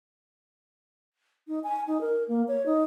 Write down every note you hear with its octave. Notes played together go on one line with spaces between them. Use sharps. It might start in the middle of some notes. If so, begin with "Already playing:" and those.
D#4
G#5
D#4
A#4
A#3
C#5
D#4